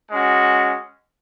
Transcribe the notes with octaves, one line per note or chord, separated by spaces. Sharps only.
G#3 C#4 F#4